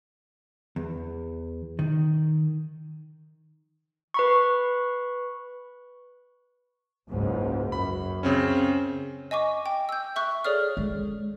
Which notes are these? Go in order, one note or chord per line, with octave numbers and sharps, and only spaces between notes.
E2
D#3
B4 B5 C#6
F#1 C#2 G#2
F#2 B5
C#3 C4 C#4
D#5 G#5 C#6 D6
G5
E6 G6
E5 C#6 F#6
G#4 A4 C#5 D5 D#6 F6
G#3